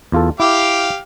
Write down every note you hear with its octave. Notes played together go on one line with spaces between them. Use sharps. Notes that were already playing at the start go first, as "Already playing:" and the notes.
E2 F4 A4
E4 G4 F5 D6